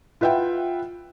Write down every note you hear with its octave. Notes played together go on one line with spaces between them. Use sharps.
F4 B4 E5 F#5 G5